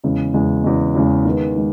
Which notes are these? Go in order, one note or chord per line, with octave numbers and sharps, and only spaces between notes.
E2 C#3 G#3
E2 C#3 G#3
E2 C#3 G#3
E2 C#3 G#3
D#3 G#3 B3
D#3 G#3